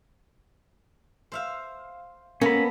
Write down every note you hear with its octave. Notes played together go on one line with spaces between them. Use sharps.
C5 E5 F5
A#3 B3 C#4 A4 B5